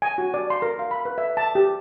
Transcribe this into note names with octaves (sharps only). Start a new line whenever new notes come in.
G#5
F#4
D5
C6
A#4
F5
B5
B4
E5
A5
G4